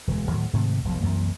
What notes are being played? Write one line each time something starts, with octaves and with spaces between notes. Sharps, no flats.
E1 D2 F#3 G#3
D2 A2 D#3 F#3
G#2 C3 D#3 A3
F1 B1 B2 F3
C2 F#2 E3 A#3